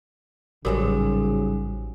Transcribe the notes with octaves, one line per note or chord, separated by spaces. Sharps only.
A1 G#2 C#3 F#3 G3 F#4 G4 G#5